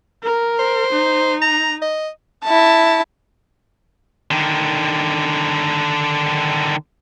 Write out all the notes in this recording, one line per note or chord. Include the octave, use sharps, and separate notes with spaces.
A#4
C5
D#4
A#5
D#5
E4 A5
D3 D#3